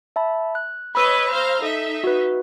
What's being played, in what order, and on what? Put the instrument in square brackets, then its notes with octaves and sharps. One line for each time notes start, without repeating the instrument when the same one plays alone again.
[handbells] E5 A5 B5
F#6
[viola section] B4 C#5 D#5 [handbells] B5 E6
[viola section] C5 F5 A#5
[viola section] D#4 E5 [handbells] A4
[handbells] F#4 B4